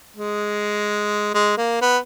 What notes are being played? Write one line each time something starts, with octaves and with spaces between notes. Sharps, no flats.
G#3
G#3
A#3
B3